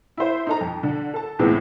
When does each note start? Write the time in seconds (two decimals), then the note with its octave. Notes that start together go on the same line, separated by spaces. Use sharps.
0.17 E4 C5
0.47 D#4 A4 A#5
0.61 F2
0.83 D3
1.14 A4 A5
1.39 C#2 A2 E3 G#3 B3 C4